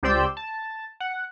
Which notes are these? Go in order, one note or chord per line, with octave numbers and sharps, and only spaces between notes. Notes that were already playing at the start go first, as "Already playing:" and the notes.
C#2 G4 C5 D5 E6 G6
A5
F#5